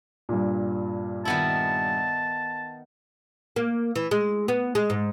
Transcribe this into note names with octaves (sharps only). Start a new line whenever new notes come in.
G2 A#2
D#3 B3 E4 A5
A#3
E3
G#3
B3
G#3
G#2